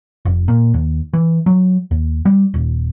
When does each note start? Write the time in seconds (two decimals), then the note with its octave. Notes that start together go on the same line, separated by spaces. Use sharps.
0.25 F1
0.48 A#2
0.74 D#2
1.13 E3
1.46 F#3
1.91 D#2
2.25 G3
2.54 D#1